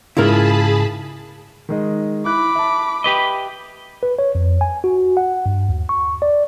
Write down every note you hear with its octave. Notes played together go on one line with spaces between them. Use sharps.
G#2 C#3 E4 F4 G#4 A#4 A5 B5
D#3 G#3 D#5
E4 B5 D6 F#6
E5 A5
G4 B4 D#5
B4
C#5
F2
G#5
F#4
F#5
G2
D#2
C#6
D5